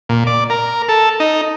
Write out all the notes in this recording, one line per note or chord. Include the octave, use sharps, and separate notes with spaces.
A#2
D5
A#4
A4
D#4